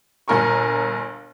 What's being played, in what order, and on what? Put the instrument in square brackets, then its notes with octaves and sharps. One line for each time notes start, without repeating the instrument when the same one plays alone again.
[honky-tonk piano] G1 A#2 A#4 G#5 C#6